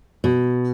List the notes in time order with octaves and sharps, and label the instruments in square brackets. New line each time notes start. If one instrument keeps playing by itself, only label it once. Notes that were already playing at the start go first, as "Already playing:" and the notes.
[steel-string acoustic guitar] B2